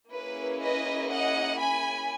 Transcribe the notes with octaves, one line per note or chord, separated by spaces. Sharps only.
A#3 C#4 E4 G#4 B4
B4 D#5
D#5 F#5
G#5 B5